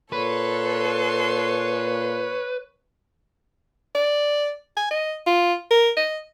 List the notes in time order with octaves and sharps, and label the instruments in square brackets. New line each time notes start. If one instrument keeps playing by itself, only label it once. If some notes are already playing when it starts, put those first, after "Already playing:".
[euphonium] A#2 [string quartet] A4 C6 [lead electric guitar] B4 [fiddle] C#5
[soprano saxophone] D5
G#5
D#5
F4
A#4
D#5